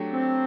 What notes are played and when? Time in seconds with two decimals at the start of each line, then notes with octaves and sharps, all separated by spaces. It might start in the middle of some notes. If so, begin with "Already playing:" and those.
Already playing: F#3 A3 D4 G4
0.12 C4